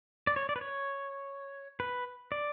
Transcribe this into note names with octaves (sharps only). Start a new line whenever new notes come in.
D5
C#5
D5
B4
C#5
B4
D5